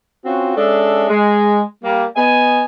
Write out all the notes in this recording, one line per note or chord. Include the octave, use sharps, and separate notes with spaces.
C4 C#4 F4 F#4
G#3 C#4 D4 A4 E5
G#3
G3 A#3
B3 D#5 G#5